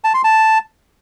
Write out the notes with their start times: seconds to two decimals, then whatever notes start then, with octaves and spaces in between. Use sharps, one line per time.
0.04 A5
0.14 C6
0.24 A5